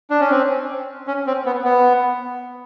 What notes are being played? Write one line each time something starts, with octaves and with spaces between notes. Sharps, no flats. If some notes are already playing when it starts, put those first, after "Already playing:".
D4
C#4
C4
C#4
C4
B3
B3